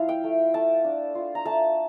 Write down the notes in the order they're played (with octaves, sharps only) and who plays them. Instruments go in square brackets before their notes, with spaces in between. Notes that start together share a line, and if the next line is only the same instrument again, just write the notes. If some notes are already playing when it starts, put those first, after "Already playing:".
Already playing: [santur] F3 E4 F5
G5
A3
A3 A5
D4
F4
A#5
A3 A5